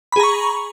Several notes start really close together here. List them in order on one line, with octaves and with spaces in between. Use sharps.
B5 G#4 A#5 C#6